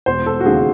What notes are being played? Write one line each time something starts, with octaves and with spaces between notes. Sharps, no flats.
E1 C5
A4
F#4
D#2 C#3 G#3 G#4